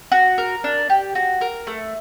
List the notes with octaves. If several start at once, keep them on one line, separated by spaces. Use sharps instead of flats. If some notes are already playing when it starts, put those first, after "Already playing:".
F#4
A#4
D4
G4
F#4
A#4
A3